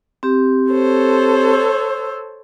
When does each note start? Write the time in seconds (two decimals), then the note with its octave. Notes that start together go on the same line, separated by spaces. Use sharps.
0.23 C4 G4
0.70 A4 C5 C#5
1.53 E6